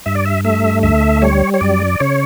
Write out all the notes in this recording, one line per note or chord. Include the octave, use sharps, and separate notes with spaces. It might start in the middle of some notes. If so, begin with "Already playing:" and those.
G2 E5
D5
E5
A3 E5
D2 E5
G3 C#5
C#5
F#2 D5
C#3 C#5